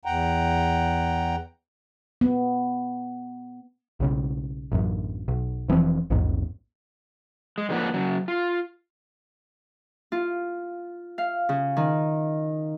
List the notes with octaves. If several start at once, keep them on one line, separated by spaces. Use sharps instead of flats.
E2 F#5 G5 A#5
B3
B1 C#3
A1 F#2
B1
F1 E3 F3 C4
A#1 E2 G#2
G#3
G#2 D3 F3 A#3 B4 F#5
C#3 F#3
F4
F4
F5
C#3
D#3